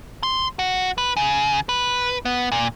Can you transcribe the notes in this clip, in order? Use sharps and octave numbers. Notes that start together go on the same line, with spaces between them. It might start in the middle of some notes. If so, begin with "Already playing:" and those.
C6
F#4
B4
C#3
B4
B3
A#2